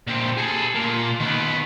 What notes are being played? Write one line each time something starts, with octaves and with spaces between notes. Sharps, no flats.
A#2 C4
G#4 A4
A#2 A#3
D#3 B3